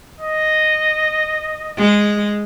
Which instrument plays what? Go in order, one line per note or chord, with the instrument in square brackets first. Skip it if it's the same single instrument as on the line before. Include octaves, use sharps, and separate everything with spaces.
[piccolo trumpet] D#5
[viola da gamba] G#3